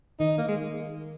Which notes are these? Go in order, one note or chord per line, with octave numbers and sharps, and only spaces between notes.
D#3 D#4
A#3
G#3